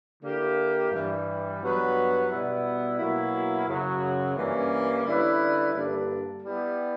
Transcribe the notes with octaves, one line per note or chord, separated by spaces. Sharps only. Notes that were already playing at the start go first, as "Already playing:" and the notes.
D3 A#3 E4 G4
G2 E3 G3
G2 F#3 B3 F#4 B4
B2 G3 B3 E4
B2 F#3 A#3 E4
F#2 C#3 F#3
G2 E3 G3 A#3 C#4
D3 G3 C#4 E4 B4
G2 D3 A#3 D4
G3 B3 E4 G4